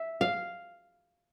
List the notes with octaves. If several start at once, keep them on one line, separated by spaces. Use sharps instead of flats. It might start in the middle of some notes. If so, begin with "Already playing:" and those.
Already playing: E5
F5